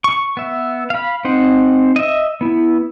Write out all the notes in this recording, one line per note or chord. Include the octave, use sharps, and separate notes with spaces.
C#6
B3 E5
F5 B5
C4 D#4 C5 F#5
D#5 E5
B3 E4